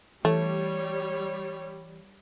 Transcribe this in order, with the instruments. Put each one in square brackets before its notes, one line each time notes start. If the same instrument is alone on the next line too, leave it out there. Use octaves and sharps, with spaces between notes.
[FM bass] E3 [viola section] G3 [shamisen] A3 [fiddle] C#5